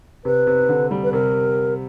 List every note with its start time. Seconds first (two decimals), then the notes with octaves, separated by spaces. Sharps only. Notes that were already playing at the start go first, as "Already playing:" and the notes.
0.25 C3 B4
0.47 C3
0.69 D3
0.91 G3
1.04 B4
1.13 C3 A#4